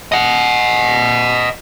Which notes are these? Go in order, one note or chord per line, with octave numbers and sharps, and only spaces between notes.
D#5 F#5